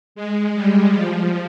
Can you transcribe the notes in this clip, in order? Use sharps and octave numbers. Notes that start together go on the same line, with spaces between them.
G#3
G3
F3